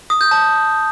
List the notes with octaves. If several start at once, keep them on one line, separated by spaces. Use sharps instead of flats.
D#6
G6
A5